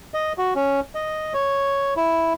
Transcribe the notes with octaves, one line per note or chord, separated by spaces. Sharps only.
D#5
F#4
C#4
D#5
C#5
E4